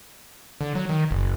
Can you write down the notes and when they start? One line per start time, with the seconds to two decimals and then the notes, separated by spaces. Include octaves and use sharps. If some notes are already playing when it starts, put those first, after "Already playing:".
0.61 D3
0.75 F#3
0.89 D#3
1.11 F#1